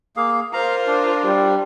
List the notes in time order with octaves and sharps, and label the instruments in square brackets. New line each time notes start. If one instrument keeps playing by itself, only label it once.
[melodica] A#3 G#4 F5
[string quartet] F4 A#4 C5 [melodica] F5 A#5
[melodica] D4
[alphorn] G3